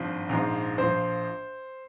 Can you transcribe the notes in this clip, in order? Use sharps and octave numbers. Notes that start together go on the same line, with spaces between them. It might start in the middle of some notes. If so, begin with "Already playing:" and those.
Already playing: G#1 G2 F3
A#1 G#2 F3
A#1 C5
F3